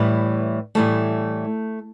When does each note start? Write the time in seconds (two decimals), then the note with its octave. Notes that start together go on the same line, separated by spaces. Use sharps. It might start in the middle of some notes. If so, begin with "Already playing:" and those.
Already playing: A2 E3 G3
0.75 A2 E3 G3 A3